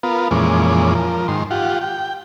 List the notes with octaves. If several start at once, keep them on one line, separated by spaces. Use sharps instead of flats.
B3 F4 A#4
F2 A#2 E3 G#3 C#4 D6
F3 A#4
G#2 D#3 C6
F4 G4 F#5
G5